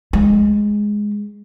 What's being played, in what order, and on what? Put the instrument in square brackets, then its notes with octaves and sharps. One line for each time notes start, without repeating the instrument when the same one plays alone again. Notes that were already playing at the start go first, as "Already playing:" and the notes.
[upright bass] G#3